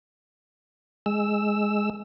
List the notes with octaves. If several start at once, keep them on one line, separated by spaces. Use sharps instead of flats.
G#3 E6